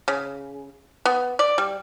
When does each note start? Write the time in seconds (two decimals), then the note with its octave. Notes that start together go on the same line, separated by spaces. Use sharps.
0.08 C#3
1.05 B3
1.39 D5
1.58 G3